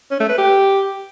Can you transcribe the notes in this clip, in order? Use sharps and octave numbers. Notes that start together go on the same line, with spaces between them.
C#4
A3
B4
G4